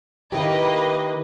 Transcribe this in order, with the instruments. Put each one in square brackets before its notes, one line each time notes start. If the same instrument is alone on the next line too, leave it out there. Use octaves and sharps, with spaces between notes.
[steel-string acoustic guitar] D#3 E4 G4 [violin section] A#3 B4 D#5